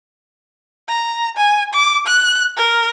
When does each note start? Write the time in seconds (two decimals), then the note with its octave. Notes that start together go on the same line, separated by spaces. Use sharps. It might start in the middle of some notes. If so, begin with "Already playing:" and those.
0.88 A#5
1.37 G#5
1.74 D6
2.07 F#6
2.57 A#4